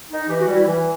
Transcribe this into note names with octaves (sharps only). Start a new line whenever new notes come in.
D#4
E3 G4
F#4
G3
E4
E3